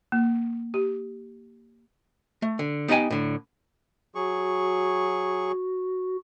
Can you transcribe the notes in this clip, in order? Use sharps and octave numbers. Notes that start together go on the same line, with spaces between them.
A#3
G4
A3
D3
B3 D#4 G4 D#5 G5 G#5
A2 D3
F#3 F#4 G#4 C#6